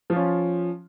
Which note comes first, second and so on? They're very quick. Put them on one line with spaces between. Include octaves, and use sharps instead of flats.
F3 F4 C#4